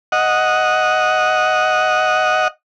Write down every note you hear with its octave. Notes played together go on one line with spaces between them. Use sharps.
D#5 F#5